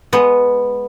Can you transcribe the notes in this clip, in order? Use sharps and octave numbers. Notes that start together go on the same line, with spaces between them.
G#3 B3